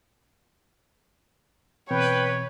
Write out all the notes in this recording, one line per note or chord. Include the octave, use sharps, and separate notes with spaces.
B2 E3 C4 B4 C#5 G5